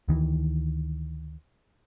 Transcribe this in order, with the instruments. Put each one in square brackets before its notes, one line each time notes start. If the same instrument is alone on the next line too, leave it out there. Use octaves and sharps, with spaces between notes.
[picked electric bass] D2 D#3 E3